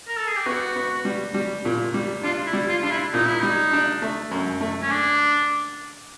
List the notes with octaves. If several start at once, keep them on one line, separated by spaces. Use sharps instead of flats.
A#4
A4
G#4
G4
B3 F#4
B3
G3
G3
A#2
G3
D4 F4
E4
G3
F4
D4 F4
E4
A#2 D#4
E4
G3 D#4
D4
A3
F#2
A3
C#4
D4